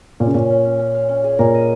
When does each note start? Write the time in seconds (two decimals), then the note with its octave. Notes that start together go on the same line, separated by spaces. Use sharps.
0.20 A#2 C#4
0.27 C#3
0.34 A#2 C#4
0.50 C#4
0.65 C#4
0.79 C#4
0.94 F5
1.09 C#4
1.24 G#4
1.39 A#2 A#4
1.54 D#5